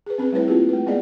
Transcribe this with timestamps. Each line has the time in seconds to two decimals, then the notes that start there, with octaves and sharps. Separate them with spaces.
0.06 G#4 B4
0.18 C4 C#4 G#4 B4
0.32 G3 A3 C4 E4 B4 C#5
0.47 A#3 C4 E4 F4 G4 G#4
0.69 A3 B4
0.86 G#3 B3 C#4 G#4 D5 D#5